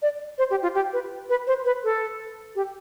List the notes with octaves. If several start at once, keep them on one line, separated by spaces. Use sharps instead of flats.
D5
C5
G4
F4
G4
B4
B4
C5
B4
A4
G4